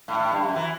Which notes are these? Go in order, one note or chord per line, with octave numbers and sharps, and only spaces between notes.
A2
A2
G2
F#2
E3